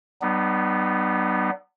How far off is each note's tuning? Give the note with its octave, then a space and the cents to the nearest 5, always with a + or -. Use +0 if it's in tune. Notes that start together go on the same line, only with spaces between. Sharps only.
G3 -40 B3 +0 D#4 -45